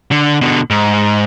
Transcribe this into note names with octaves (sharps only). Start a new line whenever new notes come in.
D3
B2 D3
G#2